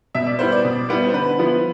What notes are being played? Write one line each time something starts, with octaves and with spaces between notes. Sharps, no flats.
B2 E5
D5
G3 B3 E4 C5
D5
B2
G3 B3 E4
C5
D3 B4
F3 B3 E4